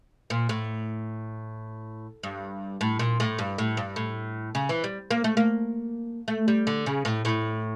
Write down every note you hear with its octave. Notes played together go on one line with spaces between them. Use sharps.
A#2
A2
G2
A2
A#2
A2
G2
A2
G2
A2
C#3
E3
G3
A#3
A3
A#3
A3
G3
D3
C#3
A2
A2